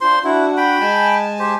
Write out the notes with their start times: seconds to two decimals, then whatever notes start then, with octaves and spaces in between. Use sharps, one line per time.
0.01 D4 F4 C5 C6
0.24 D4 E4 F#4 F#5
0.57 G5 B5
0.80 G#3 G#5 A5
1.39 G4 C5